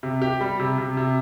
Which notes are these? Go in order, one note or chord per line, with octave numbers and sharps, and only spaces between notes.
C3
G4
G3
C3
C3
C3